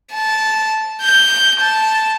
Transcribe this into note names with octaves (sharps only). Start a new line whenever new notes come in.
A5
G6
A5